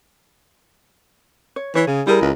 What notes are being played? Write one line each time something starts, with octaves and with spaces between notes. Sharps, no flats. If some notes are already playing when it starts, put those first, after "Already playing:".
C#5
E3 C#5
C#3 G#4
G3 E4 G#4 A#4
C#2